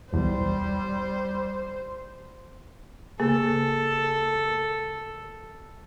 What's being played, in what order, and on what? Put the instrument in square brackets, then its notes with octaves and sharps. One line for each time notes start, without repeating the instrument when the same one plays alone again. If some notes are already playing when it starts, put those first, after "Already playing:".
[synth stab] B1 E2 [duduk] G3 [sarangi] C5
[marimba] C#3 A#3 G#4 [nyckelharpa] A4